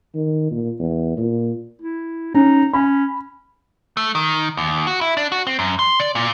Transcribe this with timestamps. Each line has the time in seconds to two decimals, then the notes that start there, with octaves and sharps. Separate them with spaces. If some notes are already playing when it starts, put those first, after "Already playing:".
0.15 D#3
0.51 A#2
0.80 E2
1.17 A#2
1.82 E4
2.34 C#4 D#4
2.73 C#4 B5
3.97 A3
4.15 D#3
4.57 D#2
4.87 F#4
5.01 E4
5.17 D4
5.32 F#4
5.47 C4
5.59 F#2
5.79 C6
6.00 D5
6.15 A#2